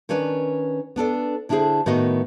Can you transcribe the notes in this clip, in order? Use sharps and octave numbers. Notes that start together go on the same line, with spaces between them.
D#3 C#4 D4 B4 D5
B3 D4 A4 D5
D3 D4 E4 G4 G#4 C5
A2 D#3 B3 F#4 A#4 D#5